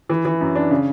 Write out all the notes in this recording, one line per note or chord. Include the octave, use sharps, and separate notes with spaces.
E3
E3
F#2
D4
C#3